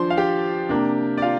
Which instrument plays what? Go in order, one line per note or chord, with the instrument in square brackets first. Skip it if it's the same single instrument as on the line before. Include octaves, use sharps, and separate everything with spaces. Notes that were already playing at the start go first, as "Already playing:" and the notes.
Already playing: [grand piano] F3 D4 C5 C6
F5
G4 G5
C3 A#3 D4
D5
F4 F5